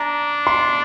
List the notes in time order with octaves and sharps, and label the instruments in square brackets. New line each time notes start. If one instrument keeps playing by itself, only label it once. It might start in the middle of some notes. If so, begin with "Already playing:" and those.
Already playing: [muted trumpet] D4 [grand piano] A#5
[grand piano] C6